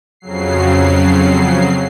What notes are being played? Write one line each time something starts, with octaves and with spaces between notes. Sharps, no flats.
F2 C#3 F#3 C7